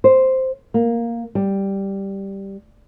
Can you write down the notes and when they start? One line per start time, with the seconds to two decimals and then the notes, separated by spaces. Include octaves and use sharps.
0.04 C5
0.74 A#3
1.35 G3